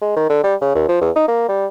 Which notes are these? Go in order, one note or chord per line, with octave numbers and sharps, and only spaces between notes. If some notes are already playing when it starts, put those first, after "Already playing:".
G#3
D#3
D3
G3
C#3
D#2
F3
E2
D#4
A#3
G3